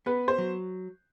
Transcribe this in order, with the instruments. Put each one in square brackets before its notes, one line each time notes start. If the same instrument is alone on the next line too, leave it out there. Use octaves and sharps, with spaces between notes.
[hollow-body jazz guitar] B3 [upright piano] B4
[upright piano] C5
[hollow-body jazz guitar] F#3